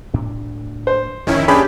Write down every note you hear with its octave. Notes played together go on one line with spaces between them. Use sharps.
D2 A2 D4
C5
D1 F2 D#3 C#4 E4
C#4 D4 G4 G#4 B5